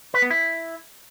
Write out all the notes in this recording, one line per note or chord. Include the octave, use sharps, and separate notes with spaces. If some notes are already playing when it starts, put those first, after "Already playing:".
B4
B3
E4